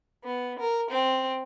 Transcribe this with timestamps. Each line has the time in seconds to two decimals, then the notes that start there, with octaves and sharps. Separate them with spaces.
0.24 B3
0.59 A#4
0.91 C4